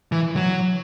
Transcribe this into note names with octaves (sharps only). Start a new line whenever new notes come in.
E3
F#3